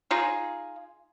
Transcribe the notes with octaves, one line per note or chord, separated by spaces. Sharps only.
D#4 F4 G#4